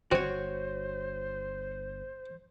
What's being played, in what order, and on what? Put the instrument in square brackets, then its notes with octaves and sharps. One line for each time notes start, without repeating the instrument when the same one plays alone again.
[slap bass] G1 [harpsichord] C4 [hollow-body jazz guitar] F#4 C#5 [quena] C5